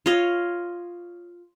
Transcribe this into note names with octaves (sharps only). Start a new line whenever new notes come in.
F4 C#5 D#5 F5